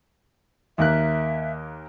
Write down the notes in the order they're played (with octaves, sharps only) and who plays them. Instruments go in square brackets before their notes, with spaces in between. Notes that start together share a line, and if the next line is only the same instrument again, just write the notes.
[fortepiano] D#2 A#3 F#6 [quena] E5